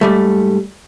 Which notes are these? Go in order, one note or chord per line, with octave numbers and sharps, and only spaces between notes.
G#2 G3 A3